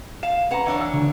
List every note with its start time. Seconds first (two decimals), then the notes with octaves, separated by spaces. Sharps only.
0.23 F5 E7
0.51 C#4 B4 F#5 A#5
0.66 E3 D4 C#5
0.81 E6
0.94 D2